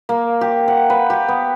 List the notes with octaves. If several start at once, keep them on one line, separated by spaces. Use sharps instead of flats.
A#3
G4
F#5
B4
G4
B3